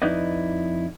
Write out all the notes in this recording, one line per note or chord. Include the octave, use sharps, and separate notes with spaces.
F2 D#4 E4 B4 D5 D#5